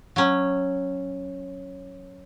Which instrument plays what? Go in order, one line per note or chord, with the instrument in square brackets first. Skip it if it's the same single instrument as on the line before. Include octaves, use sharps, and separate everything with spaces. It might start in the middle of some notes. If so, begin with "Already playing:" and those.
[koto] F#3 C#4